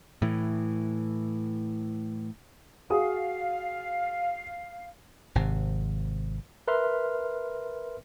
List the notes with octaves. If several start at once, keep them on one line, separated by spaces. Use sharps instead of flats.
A2 E3
F#4 G#4 F5 D#6
G#1 C3
A#4 B4 E5 C6 F6